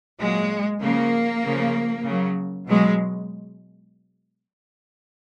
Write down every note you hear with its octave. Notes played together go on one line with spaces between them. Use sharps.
A#2 F#3 G#3
C#3 F3 A#3
C#3 F3
C#3 F#3
B2 F#3 G#3